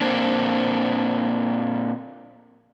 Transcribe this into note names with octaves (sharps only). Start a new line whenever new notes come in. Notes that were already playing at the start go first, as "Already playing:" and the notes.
A#2 A#3 C4 D4